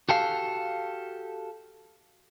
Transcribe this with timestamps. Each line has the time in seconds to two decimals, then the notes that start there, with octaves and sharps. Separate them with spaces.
0.09 F#4 G4 A4 F5